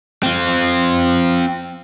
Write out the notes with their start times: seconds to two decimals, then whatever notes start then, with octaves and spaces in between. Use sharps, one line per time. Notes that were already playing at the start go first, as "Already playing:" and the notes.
0.23 C4 F4